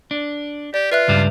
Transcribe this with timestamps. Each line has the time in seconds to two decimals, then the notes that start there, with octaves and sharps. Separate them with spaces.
0.11 D4
0.74 G4 D5
0.92 F4 B4 E5 F#6
1.08 C#2 G2 G3